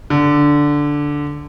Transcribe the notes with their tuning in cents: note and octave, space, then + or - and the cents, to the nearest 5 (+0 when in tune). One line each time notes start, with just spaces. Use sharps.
D3 -5